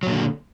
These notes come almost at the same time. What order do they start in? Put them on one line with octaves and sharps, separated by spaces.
F#3 A#2 D3